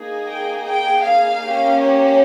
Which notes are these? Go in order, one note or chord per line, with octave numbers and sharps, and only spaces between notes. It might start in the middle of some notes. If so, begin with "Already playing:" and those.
Already playing: A#3 D#4 G#4
G5
G5
F5
A#3 C#4 G4
C#5